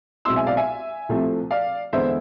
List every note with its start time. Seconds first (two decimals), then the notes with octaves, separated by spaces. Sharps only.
0.25 B1 B2 G#3 C4 E4 C6 E6
0.36 E5 G#5
0.47 D5 F5
0.57 E5 G#5
1.09 C2 C3 F3 A3 C4
1.51 D5 F5
1.93 E2 D3 G#3 B3 E4 C5 E5